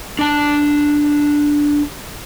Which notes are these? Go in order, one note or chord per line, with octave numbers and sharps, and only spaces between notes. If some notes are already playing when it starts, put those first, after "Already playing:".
D4 A5